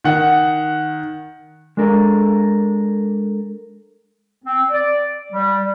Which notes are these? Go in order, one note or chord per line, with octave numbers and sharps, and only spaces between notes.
D#3 F#5
G#3 D4 A4 A#4
C4
D5
G3